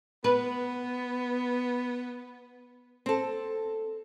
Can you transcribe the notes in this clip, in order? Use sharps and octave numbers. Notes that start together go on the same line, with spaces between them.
B3 B4
C4 A4